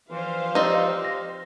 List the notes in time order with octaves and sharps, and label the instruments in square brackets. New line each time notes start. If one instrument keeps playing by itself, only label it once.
[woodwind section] G2 E3 [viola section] F3 C5 F5
[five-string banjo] C4 D#4 [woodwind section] G4 [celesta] B4 D5 D#5
[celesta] A#6